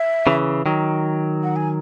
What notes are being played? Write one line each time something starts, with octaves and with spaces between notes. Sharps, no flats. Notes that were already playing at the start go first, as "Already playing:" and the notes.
Already playing: E5
C#3 E3
D#3 F#3
F#5
G#5